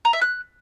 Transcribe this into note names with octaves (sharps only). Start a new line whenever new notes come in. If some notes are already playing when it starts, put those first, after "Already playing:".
A#5
E5
F#6